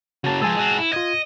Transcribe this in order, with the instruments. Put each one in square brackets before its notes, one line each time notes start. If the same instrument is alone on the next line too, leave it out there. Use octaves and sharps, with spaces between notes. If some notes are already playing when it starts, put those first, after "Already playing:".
[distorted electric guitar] C#3 A#3 [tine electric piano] F#4 A5
[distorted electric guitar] F3 G#3 [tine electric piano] G#5 A5 E6
[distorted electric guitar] G#3 F#4
E4
[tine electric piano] F4 G#6 [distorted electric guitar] D#5